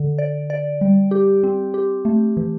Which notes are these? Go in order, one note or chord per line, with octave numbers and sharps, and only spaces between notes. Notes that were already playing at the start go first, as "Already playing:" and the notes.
Already playing: D3
D5
D5
G3
G4
C4
G4
A3
E3